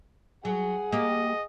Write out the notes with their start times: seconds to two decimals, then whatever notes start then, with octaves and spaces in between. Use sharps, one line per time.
0.45 F#3 G#4 F#5
0.92 A#3 G4 D#5